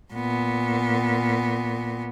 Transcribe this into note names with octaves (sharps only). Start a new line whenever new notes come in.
A#2 B3